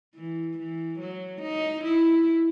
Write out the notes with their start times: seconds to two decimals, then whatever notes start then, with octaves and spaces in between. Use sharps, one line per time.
0.15 E3
0.58 E3
0.99 F#3
1.42 D#4
1.84 E4